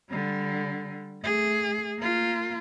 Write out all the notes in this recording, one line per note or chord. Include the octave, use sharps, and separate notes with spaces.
D3 G3
A3 G#4
A#3 F4